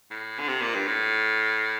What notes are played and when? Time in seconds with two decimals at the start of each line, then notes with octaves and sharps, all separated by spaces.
0.11 A2
0.39 D3
0.49 C3
0.62 A#2
0.74 G2
0.87 A2